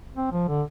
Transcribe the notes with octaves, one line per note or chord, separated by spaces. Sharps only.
C4
F3
D3